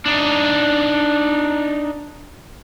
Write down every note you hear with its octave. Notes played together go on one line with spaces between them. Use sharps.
D4 D#4